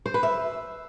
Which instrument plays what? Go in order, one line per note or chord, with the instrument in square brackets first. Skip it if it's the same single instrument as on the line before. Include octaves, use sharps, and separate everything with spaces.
[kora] C5
B4
E5